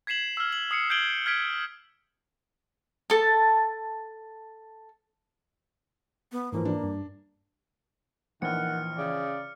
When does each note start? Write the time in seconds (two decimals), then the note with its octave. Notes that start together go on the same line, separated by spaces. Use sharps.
0.07 G#6 B6 C7 E7 F#7
0.37 E6 F6
0.52 F#7
0.71 D#6 C7 C#7
0.90 G6 G#6 C7 D7 F#7 G7
1.26 F6 G#6 B6 D7
3.10 A4 A5
6.32 B3
6.52 G#2 E3 F3 A#3
6.65 D4
6.83 G2
8.42 A#1 D#3 E3 F#5 F6 C#7
8.98 C#3 D5